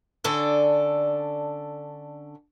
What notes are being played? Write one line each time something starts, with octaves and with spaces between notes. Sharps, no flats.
D3 C#4 D4 A4 D5